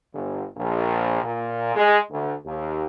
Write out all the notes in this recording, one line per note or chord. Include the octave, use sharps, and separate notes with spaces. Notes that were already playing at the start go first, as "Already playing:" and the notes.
G1
A#1
A#2
G#3
D2
D#2